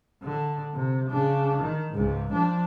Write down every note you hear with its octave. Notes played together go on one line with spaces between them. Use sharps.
D3
C3
C#3 D4
D#3
C#2 G#2
F3 D4